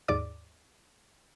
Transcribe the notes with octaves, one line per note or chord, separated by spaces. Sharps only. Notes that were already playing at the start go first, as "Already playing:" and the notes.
D#2 G#2 D5 D6